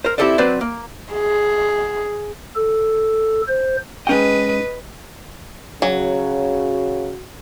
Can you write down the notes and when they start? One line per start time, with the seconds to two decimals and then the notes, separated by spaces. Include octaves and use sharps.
0.05 A#4 C5
0.18 C4 E4 G4 A4 C5 D5
0.38 F#3 C4 D4 B4 C5 D5
0.61 A#3
1.13 G#4
2.56 A4
3.48 C5
4.07 G#2 C#4 B4 D#5 G5
5.82 C#3 F#3 F#4